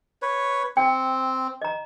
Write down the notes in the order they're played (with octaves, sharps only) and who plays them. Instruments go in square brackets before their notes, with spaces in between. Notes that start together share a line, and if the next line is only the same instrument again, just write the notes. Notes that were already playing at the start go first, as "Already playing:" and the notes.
[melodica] B4 C#5
[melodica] C4 [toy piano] G5
[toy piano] D#5 A#5